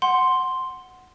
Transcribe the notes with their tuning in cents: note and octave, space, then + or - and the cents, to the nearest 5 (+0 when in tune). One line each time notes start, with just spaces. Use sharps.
F#5 +0 C6 +0